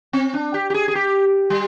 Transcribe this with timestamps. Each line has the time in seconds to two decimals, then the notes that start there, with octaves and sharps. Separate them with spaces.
0.13 C4
0.34 D4
0.54 G4
0.70 G4
0.74 G#4
0.88 G#4
0.95 G4
1.50 G3